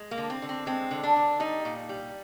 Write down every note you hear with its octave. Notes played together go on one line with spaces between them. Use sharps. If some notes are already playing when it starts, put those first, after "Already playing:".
Already playing: G#3
A#3
D3
C4
D3
C4
G#3 C4
D3
D4
D3
G3 D#4
A#2
G3